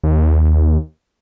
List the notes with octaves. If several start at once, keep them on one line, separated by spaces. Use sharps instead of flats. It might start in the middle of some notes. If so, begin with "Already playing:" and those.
D#2